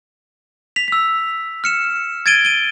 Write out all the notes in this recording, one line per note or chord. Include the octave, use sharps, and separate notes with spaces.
B6 F7
E6 B6
F6 C#7 E7
G#6 A6 D7 D#7 G7
D#7 G7